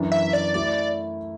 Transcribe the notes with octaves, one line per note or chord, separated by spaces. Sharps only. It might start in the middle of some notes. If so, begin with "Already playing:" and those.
Already playing: F#2 E3 D4
E5
D5
A3 E4 D5